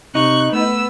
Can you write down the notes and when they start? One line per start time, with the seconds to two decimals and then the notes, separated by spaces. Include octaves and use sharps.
0.15 C3 D#4 C#6 F#6
0.52 A3 B3 E6